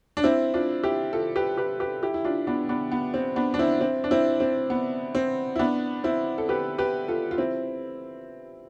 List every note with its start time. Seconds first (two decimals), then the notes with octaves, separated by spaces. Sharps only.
0.17 D4
0.24 C4 E4
0.54 D4 F4
0.83 E4 G4
1.13 F4 A4
1.35 G4 B4
1.57 G4 B4
1.80 G4 B4
2.03 E4 G4
2.14 E4
2.24 D4 F4
2.47 B3 D4
2.69 B3 D4
2.92 B3
3.14 C4
3.36 B3 D4
3.54 D4
3.59 C4 E4
3.81 C4 E4
4.04 D4
4.11 C4 E4
4.40 C4
4.70 B3
5.15 C4
5.56 E4
5.59 B3 D4
6.04 C4 E4
6.38 A4
6.49 G4 B4
6.78 G4 B4
7.08 F4 A4
7.31 F4
7.38 C4 E4